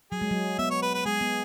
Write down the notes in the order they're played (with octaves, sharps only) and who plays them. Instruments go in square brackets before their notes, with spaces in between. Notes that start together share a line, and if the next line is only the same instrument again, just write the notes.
[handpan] F#3 [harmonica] G#4
[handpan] G#3
F#3
[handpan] B3 [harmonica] E5
[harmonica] C#5
B4
B4
[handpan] G#3 [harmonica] G#4
[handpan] B3